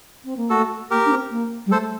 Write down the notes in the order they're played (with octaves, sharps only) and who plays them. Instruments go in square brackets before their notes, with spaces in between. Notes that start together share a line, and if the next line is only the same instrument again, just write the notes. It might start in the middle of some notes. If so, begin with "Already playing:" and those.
[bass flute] C4
A#3
[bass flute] A3 [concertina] F#4 A4
[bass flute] A#3 [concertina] G4 A#4
[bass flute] D4
C4
A#3
G3
[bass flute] A3 [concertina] A4 C5